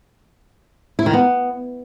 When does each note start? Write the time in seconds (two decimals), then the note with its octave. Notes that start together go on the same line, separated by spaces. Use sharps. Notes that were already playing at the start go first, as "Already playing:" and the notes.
0.99 E4
1.06 D#3
1.13 B3